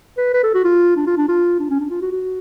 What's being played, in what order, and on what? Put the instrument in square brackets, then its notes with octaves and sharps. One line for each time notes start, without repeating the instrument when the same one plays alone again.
[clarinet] B4
B4
A4
F#4
F4
D4
F4
D4
F4
D4
C#4
D4
F4
F#4
F#4